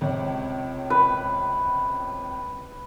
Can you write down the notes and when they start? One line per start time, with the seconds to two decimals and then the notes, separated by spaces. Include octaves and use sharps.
0.01 C#2 C3 C#5
0.90 B4